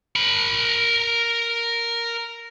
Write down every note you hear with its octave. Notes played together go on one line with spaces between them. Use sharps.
A#4 B5